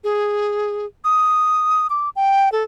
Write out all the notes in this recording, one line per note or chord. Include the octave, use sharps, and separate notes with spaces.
G#4
D#6
D6
G5
A4